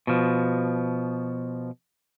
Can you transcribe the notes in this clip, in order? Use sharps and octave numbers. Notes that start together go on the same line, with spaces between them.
B2 F3